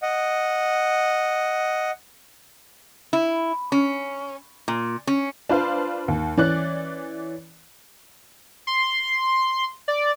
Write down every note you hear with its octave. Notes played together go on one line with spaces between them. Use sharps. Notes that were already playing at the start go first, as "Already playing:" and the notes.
D#5 F#5
E4
C#4
A#2
C#4
D4 F4 B4 C5 F5
D#2
E3 C#4 D5 F#6
C6
D5